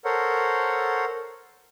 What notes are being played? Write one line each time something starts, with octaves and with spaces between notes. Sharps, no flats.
A4 A#4 C5 C#5 F#5